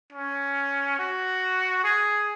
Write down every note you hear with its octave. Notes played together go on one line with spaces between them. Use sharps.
C#4
F#4
G#4